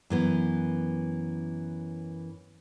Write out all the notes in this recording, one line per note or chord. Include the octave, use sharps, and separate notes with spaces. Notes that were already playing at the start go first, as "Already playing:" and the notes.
F#2 E3 B3